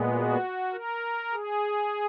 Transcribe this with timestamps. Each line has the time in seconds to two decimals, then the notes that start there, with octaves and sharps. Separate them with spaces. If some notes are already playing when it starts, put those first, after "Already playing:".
Already playing: A#2 G#3 B3
0.13 F#4
0.72 A#4
1.33 G#4